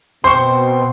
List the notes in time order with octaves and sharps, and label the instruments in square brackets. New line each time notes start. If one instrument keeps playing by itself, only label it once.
[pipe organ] B2 [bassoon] C4 [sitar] C5 [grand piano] C6 C#6